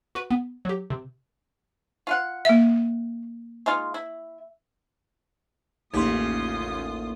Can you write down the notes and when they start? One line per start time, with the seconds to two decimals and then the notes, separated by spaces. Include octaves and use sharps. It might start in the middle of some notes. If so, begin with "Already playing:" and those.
0.15 F#4 B4
0.31 B3
0.65 F#3 G4
0.90 C3
2.07 F4 F5 F#5
2.45 A#3 E5
3.66 G#3 D#4 F4
3.94 E4
5.93 A1 D#2 C#3 D#4 F4 G4 C6 D#6